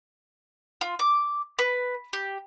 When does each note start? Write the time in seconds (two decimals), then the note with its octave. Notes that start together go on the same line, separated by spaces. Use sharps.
0.81 F4
0.99 D6
1.59 B4
2.13 G4